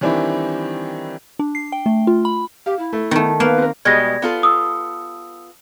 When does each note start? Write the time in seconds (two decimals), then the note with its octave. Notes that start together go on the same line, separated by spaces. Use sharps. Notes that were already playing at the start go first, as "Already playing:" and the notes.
0.01 D#3 E3 G3 C4 D4 E4
1.39 D4
1.55 C7
1.72 G5
1.86 A3
2.07 F4
2.25 B5
2.66 G4 F5
2.79 E4
2.93 A3
3.11 D#3 A3 B3
3.40 A#3 B3 B4
3.58 C4 A#4
3.85 B2 G3 G#3 G#6 A#6
4.22 B3 F4 A4
4.43 D#6 E6